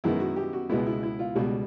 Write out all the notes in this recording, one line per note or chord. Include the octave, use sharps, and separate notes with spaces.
F#2 D#3 G#3 B3 E4
F#4
G4
F#4
C#2 B2 G#3 B3 E4
E4
E4
F4
C#2 B2 G3